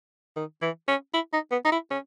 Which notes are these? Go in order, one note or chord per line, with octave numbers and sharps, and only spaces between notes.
D#3
E3
C#4
E4
D#4
B3
D#4
E4
C#4